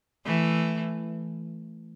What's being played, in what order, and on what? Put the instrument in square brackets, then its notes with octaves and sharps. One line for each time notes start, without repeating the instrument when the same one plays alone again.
[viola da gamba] E3 A3